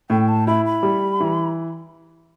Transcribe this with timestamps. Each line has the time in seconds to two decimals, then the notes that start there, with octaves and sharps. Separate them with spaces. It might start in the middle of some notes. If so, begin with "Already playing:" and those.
0.10 A2 G5
0.28 A5
0.47 E4 B5
0.65 B5
0.83 G3
1.20 E3